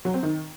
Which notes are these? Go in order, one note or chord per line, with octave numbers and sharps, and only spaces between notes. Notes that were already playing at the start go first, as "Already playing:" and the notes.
F#3
C4
D#3